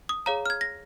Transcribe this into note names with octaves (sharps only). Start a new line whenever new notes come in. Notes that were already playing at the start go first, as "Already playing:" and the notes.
D#6
G#4 C#5 F5 A#5
F6
G#6
A#6